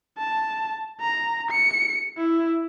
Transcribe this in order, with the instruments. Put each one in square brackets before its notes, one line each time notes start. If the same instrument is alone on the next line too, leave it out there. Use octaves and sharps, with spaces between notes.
[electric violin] A5
A#5
C#7
E4